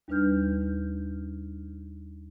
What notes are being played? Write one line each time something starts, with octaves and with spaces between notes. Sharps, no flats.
D#2 G3 D4 B4 F6 G6